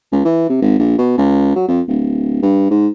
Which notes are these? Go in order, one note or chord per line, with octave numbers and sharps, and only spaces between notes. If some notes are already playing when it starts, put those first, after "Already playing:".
C#2
E3
C3
G#1
A#1
B2
C#2
F#3
F2
D1
G2
G#2